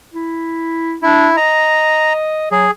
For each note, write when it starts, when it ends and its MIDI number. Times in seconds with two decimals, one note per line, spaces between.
0.14 0.96 64
1.03 1.29 62
1.03 1.36 64
1.37 2.51 75
1.37 2.13 82
2.51 2.67 54
2.51 2.71 68